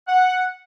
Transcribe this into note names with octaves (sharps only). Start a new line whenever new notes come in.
F#5